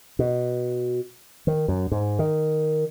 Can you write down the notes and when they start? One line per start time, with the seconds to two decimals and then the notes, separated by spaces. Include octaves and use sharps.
0.19 B2
1.47 D#3
1.68 F#2
1.92 G#2
2.19 D#3